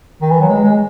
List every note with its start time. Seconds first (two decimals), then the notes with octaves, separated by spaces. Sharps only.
0.22 D#3
0.31 E3
0.41 F#3
0.50 G#3
0.64 G#3